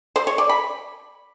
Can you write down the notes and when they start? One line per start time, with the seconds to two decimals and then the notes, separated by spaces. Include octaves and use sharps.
0.16 C5
0.27 C#5
0.38 D5
0.49 B5